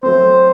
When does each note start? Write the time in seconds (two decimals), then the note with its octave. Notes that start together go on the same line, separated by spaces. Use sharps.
0.03 F#3 A3 C4 C5